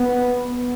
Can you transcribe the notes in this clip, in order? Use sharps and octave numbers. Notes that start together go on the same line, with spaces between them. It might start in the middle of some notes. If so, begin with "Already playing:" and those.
Already playing: B3